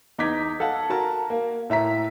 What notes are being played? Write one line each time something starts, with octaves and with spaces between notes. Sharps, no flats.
E2 D#4 D6 G#6 B6
A4 F5 F#5 A5
F#4 A#4 A5 A#5
A#3
A2 E5 A#5 B6